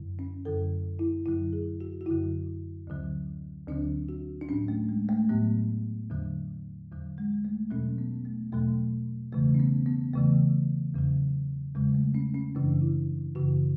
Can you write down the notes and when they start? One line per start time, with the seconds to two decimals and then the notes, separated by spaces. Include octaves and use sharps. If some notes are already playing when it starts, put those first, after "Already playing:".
Already playing: F#2 D3 F#3
0.19 C#4
0.45 F#2 D3 F#3 A4
0.99 E4
1.26 F#2 D3 F#3 E4
1.53 G#4
1.81 F#4
2.01 F#4
2.06 F#2 D3 F#3 E4
2.87 D2 D3 F#3
3.68 D2 D3 F#3 D4
4.09 F#4
4.41 D4
4.49 A2 F#3 C#4
4.68 A3
4.89 G#3
5.09 A3
5.29 A2 F#3 B3
6.10 E2 D3 F#3
6.91 E2 D3 F#3
7.18 G#3
7.45 A3
7.71 E2 B2 F#3 C#4
7.98 B3
8.25 A3
8.52 E2 B2 F#3 A3
9.32 E2 C#3 E3 A3
9.55 C#4
9.60 B3
9.86 B3
10.13 E2 C#3 E3 A3
10.94 E2 C#3 F#3
11.74 E2 C#3 F#3 G#3
11.95 A3
12.15 C#4
12.35 C#4
12.55 F#2 C#3 E3 D4
12.82 E4
13.35 F#2 C#3 E3 F#4